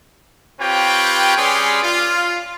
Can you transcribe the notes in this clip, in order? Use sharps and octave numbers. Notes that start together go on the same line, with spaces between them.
C4 F4 G4 B4 C#5 G5
G3 C#4 G#4 B4 D5 C6
F4